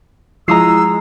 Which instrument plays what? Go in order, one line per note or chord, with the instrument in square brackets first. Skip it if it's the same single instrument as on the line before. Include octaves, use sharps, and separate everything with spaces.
[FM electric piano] F3 E4 F4 [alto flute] G#3 [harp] A#5 D#6 C7 [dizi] E6